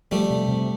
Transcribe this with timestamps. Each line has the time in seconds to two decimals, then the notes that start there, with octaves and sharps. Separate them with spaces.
0.11 F3 G3 A3
0.30 C3
0.48 C3